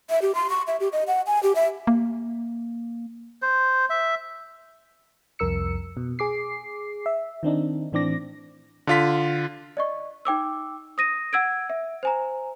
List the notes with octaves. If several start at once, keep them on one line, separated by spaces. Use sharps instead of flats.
E5
G4
C6
C#6
E5
G4
D#5
F#5
G#5
G4
E5
A#3
C5
E5
C2 F2 A#4 E6 C#7
B2
G#4 D6 C7
E5
D#3 C4 D4 D#4
A2 E3 C4 D4 D6 A#6
D3 F4 B6
D5 D#5 C#6
D#4 G5 D6 E6
D#6 A#6 D#7
F#5 E6 G#6 D7
E5
C5 G#5 A#5